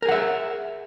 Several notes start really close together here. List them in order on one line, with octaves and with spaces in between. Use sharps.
A#4 G#4 F#5 E5